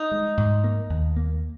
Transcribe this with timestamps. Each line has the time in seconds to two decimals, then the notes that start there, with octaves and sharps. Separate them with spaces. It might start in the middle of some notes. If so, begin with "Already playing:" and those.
Already playing: D#4
0.11 G#3
0.37 G#2
0.64 A#3
0.90 D#2
1.16 A#3